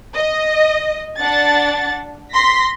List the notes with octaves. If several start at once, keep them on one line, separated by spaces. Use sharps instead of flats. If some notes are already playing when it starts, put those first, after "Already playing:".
D#5
D4 F#5 A6
C6 A#6 B6